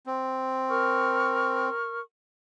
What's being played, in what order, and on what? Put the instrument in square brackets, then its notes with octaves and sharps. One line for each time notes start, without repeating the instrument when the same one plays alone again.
[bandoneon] C4
[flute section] A#4 C#6 F6